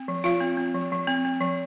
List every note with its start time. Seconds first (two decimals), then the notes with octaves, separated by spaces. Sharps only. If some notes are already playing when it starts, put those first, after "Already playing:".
Already playing: C4
0.08 F3
0.24 F3 F4 F5
0.41 C4
0.57 C4
0.74 F3
0.92 F3
1.08 C4
1.25 C4
1.41 F3